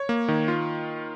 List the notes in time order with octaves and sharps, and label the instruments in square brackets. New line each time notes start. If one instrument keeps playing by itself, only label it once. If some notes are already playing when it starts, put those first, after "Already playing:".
Already playing: [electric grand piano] C#5
A#3
D#3
F4